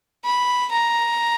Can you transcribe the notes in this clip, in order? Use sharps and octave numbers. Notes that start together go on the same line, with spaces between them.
B5
A#5